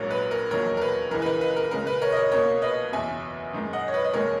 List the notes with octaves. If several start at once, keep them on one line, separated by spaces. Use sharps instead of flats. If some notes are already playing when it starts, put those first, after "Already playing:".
Already playing: A#1 G#2 F#3 A#3 A#4 C#5
B4
A#4
E1 D#2 D#3 F#3 A#4 C#5
A#4
B4
C#2 C#3 E3 A#4
B4
A#4
B4
A#4
C#2 C#3 G#3 A#4
B4
A#4 C#5
D#5
A#4 C#5
B1 B2 A#3 A#4 C#5
B4 D#5
F#1 E2 B2 E5 G#5
F#2 D#3 G#3
D#5 F#5
C#5
B4 D#5
D#5
E1 D#2 D#3 G#3 A#4 C#5